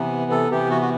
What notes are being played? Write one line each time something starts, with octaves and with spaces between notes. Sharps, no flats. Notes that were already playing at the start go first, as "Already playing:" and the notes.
Already playing: C3 E3 B3
A4
C3 E3 B3 G4
F#4
F#4